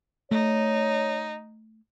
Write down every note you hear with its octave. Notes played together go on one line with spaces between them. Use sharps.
A3 D#4 C#5